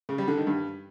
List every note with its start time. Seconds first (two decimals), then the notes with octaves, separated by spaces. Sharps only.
0.09 C#3
0.18 G3
0.28 D3
0.37 D#3
0.47 G2